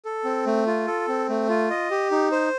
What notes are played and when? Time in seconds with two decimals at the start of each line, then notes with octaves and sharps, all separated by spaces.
0.05 A4
0.25 C4
0.46 A3
0.66 F4
0.87 A4
1.08 C4
1.29 A3
1.49 F4
1.70 D#5
1.91 G4
2.11 D#4
2.32 C5